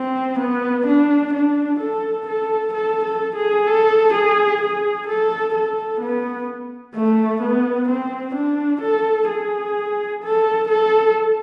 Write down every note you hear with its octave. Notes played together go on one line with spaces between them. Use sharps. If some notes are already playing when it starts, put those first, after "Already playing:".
Already playing: C4
B3
D4
D4
A4
A4
A4
A4
G#4
A4
G#4
G#4
A4
A4
B3
A3
B3
C4
D4
A4
G#4
A4
A4